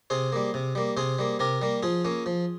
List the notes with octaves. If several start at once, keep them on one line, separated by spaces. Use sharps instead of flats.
C3 G#4 C5
G3 A#3
C3
G3 A#3
C3 G#4 C5
G3 A#3
C3 G4 A#4
G3 A#3
F3 F4 G#4
A#3 C#4
F3